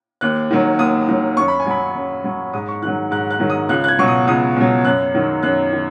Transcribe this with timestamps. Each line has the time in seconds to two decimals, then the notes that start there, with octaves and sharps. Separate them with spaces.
0.21 D#2 F#6
0.51 D#3 F#3
0.79 D#2 D#6
1.09 D#3 F#3
1.37 F#2 C#6
1.48 B5
1.60 G#5
1.67 F#3 B5
1.95 F#2
2.24 F#3
2.53 G#2 D#6
2.68 C#6
2.82 D#3 F#6
2.87 F#3
3.11 G#2 F#6
3.31 F#6
3.40 D#3 F#3
3.50 D#6
3.69 C#2 F#6
3.84 F#6
3.88 G#6
3.99 B2 F#3 C#6
4.08 D#6
4.27 C#2 D#6
4.57 B2 F#3
4.85 F#2 F#6
5.14 D#3 F#3
5.43 F#2 F#6
5.73 D#3